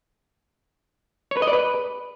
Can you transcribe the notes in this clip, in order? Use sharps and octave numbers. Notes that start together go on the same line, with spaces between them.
C#5
B4
D#5
D5
B4